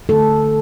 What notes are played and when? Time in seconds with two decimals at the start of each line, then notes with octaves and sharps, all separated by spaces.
0.09 D3 A3 A4